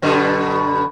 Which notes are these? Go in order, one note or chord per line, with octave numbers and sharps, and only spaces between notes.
F#2 B2 D3